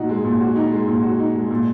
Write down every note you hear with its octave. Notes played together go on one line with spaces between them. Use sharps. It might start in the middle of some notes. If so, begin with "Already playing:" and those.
Already playing: A#2 D#4 F#4
G#3
A#2
F#4
D#4
G#3
A#2
F#4
D#4
G#3
A#2